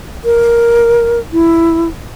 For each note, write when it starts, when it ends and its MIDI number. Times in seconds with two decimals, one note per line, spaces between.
0.25 1.20 70
1.33 1.88 64